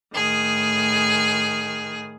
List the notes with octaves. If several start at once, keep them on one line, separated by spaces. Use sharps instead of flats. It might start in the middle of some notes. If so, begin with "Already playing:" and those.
A2 D#3 G#4